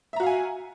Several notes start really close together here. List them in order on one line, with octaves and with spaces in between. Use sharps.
E5 A#5 F#4 F5 G#5